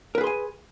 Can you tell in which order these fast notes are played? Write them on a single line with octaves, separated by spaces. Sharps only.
A#4 B4 G#4 C6 G#5